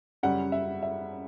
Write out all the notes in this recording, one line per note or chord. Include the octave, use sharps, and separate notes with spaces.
F#2 C#3 G3 C#4 F#5
E5
E5